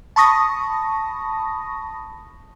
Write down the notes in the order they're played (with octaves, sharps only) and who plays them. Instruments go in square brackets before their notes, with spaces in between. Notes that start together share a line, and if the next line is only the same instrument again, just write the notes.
[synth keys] A5 B5 C#6 D#6 A#6